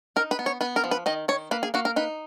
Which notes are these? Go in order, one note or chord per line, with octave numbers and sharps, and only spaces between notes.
D#4 A#4
B4
B3
C#5
B3 B4
A#4
F3
B4
D#3 D#5
D#3 C#5
A#3 B4
G#4
A#3 F#4
A#4
D#4 B4